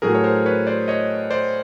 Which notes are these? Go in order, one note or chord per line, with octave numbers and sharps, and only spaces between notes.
A2 F#3 A3 G#4 A#4
C#5
A#4 C5
B4 C#5
C5 D5
C#5 D#5
C5 D5